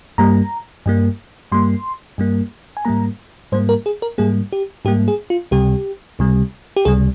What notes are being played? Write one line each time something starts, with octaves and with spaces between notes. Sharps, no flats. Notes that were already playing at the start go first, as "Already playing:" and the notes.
G2 G3 A#3 A#5
G2 G3 A#3
G2 G3 A#3 C6
G2 G3 A#3
G#5
G#2 G3 A#3 A#5
G#2 G3 A#3 C5
A#4
G#4
A#4
G#2 G3 A#3 G#4
G4
G#2 G3 A#3 G4
G#4
F4
C#2 C3 G3 G4
C#2 C3 G3
G4
C#2 C3 G3 G#4